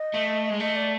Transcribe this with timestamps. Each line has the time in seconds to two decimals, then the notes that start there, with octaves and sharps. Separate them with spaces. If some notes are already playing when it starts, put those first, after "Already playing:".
Already playing: D#5
0.14 A3
0.50 G#3
0.60 A3 D#5
0.76 D5